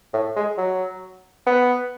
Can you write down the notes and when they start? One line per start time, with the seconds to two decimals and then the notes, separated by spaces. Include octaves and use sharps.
0.14 A2
0.36 G#3
0.58 F#3
1.47 B3